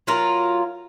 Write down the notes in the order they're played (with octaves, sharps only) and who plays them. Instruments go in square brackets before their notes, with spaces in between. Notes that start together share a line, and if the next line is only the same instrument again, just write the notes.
[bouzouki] F#3 F4 A#4